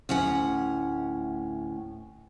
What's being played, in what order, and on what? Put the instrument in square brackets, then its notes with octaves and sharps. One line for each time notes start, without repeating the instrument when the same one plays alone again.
[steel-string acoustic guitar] D2 A2 C#4 F#5